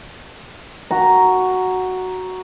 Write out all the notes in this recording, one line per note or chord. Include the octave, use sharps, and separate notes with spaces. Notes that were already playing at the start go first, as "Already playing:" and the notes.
F#4 A#5